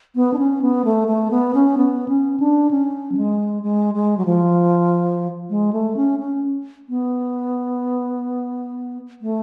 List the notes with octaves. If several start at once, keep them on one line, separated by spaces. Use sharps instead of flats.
B3
D4
C#4
B3
A3
A3
B3
C#4
B3
C#4
D4
C#4
F#3
G#3
G#3
G#3
F#3
F3
G#3
A3
C#4
C#4
B3
A3